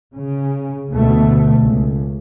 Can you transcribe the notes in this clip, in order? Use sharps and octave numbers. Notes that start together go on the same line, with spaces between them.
C#3
D2 B2 A3
C#2